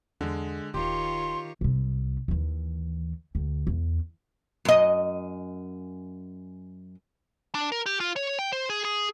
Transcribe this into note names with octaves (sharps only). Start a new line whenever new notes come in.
E2 D3 G#3
D#1 D#3 F4 G4 C#5 C6
C2 C3
D#2 E3
D2
E2
F#2 D#5
D4
A#4
G4
F4
C#5
G5
C5
G#4
G#4